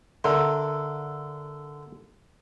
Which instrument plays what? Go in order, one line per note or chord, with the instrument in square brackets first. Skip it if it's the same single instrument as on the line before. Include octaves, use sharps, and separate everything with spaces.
[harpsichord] D3 C6 [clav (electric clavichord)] A4 A#4 E5